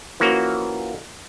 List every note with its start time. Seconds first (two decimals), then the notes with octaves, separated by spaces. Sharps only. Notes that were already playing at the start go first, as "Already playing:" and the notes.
0.20 E3 F3 A#3 C#4 F#4